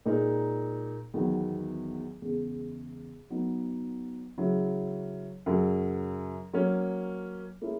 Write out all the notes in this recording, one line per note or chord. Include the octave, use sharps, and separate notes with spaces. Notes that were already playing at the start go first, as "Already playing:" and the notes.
A#2 G#3 D#4 A#4
E2 D#3 F#3 B3
E2 C#3 G#3
F#3 B3 D#4
C#3 F#3 C#4 E4
F#2 C#3 F#3
F#3 A#3 C#4
A#3 C#4 E4 G#4